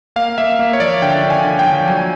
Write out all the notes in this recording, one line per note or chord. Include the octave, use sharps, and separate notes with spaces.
A#3 F5
A#3 E5
A#3
C#5
F3 D5
D3 G5
D3
G#5
D3
G5
F3
F#3 G#5